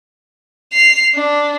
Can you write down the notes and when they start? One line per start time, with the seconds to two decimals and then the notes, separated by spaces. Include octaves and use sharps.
0.73 C7 F7
1.14 D4